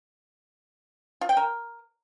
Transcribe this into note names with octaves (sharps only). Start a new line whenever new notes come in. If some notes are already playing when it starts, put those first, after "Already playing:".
F4
G5
A#4